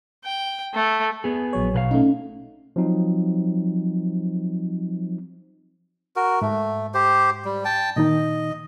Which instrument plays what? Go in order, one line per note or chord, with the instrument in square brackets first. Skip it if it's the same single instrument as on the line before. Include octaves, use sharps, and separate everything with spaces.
[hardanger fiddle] G5
A3
[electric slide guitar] B3 G#4
[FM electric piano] A#1 F#3 C#5
[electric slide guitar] B2 B4 F5
[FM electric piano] A3 D#4 [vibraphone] C#4
[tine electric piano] F3 F#3 C4 D#4
[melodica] F#4 A#4
[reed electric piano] G#2 [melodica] A3
[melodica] G4 C5
G3
G5 A5
[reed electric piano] A#2 D#3 D#4 [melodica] D#5